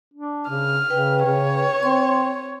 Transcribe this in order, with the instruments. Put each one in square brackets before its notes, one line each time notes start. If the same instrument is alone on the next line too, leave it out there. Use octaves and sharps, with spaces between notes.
[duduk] D4
[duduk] C#3 [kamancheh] F6
[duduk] C#3 [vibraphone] B4 G5
[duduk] C#3 [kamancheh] C#5
[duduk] C4 [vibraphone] C6